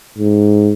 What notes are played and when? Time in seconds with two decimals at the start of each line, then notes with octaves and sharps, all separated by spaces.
0.18 G#2